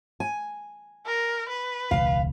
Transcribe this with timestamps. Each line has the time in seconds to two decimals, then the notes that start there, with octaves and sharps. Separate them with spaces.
0.20 G#5
1.06 A#4
1.49 B4
1.91 E1 C#2 F5